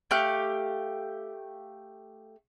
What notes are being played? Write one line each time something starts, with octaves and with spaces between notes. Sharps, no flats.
A3 G4 F5 F#6